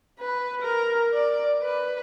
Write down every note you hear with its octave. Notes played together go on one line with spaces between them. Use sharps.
B4
A#4
D5
B4